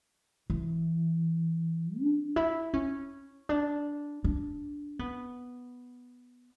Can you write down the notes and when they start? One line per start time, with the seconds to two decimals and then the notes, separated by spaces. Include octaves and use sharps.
0.50 E3
2.00 D4
2.36 E4
2.74 C#4
3.49 D4
4.24 D4
4.99 B3